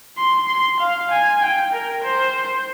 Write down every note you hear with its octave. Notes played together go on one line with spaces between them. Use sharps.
C6
C6
F5
G#5
G5
A#4
C5